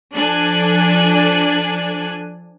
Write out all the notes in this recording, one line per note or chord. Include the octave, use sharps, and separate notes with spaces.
F3 D4 A4 G#5 F#6